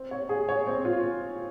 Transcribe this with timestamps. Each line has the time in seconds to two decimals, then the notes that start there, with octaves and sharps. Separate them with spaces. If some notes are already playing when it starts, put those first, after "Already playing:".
Already playing: C4
0.11 C#5
0.29 G#4
0.49 C#5
0.67 C4
0.85 F4